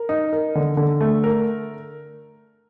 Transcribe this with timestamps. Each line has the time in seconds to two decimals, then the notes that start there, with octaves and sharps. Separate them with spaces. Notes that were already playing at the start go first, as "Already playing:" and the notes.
Already playing: A#4
0.09 D#4
0.33 A#4
0.55 D3
0.77 D3
1.01 A3
1.24 A#4